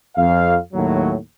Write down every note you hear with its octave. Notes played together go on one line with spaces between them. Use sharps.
F2 F5
D#2 A2 F#3